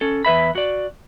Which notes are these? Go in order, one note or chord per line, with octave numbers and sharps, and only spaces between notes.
C#4 A4
E2 B4 E5 B5
F#4 D5